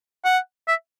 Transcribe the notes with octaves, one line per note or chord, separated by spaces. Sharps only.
F#5
E5